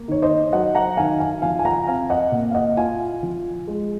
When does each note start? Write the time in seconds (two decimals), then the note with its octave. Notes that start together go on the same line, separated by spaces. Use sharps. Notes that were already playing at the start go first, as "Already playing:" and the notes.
Already playing: A#3
0.08 D#3 C#5
0.22 C5 D#5
0.53 F#3 D#5 F#5
0.75 F#5 A#5
0.97 D#3 F5 G#5
1.20 F5 G#5
1.42 F3 F5 G#5
1.59 G#5
1.65 F#5 A#5
1.87 C4 F5 G#5
2.10 D#5 F#5
2.32 A#2
2.51 F5
2.55 D#5 F#5
2.77 F4 F5 G#5
3.23 F3
3.67 G#3